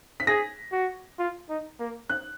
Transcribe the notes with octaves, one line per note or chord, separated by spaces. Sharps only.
B6
G#4 A#6
F#4
F4
D#4
A#3
F#6